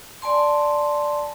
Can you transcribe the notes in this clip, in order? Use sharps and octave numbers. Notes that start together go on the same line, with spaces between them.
D5 G#5 A5 C6